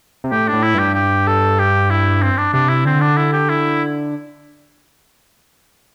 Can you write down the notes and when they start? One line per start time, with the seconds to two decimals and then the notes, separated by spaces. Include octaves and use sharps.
0.24 C3
0.32 A2 G4
0.48 D4
0.53 A2
0.63 E4
0.74 G2 G4
0.95 G4
1.27 A4
1.59 G4
1.91 E4
2.22 C4
2.37 D4
2.53 C3 D4
2.69 E4
2.85 D3 C4
3.01 D4
3.17 E4
3.33 G4
3.50 E4